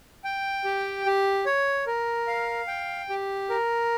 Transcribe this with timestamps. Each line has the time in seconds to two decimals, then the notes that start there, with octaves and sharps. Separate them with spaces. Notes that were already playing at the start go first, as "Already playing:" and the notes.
0.24 G5
0.64 G4
1.06 G4
1.46 C#5
1.87 A#4
2.27 F5
2.68 G5
3.09 G4
3.50 A#4